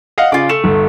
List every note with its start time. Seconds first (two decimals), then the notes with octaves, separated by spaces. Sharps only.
0.18 D#5 F5 F#5
0.32 C#3 F4 D5
0.49 A3 E7
0.64 G1